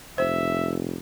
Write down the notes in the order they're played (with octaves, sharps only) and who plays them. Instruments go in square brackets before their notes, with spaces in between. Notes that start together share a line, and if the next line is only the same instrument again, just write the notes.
[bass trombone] F1 [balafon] C5 [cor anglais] E5